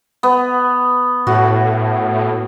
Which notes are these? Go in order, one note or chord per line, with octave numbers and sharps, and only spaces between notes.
B3
A2 F#4